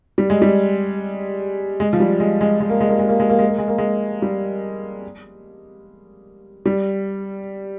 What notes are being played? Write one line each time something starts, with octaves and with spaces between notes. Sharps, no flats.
G3
G#3
G3
G#3
F3
G3
G#3
G#3
G#3
A#3
G#3
A#3
G#3
A#3
G#3
A#3
G#3
A#3
G#3
A#3
G#3
G3
G3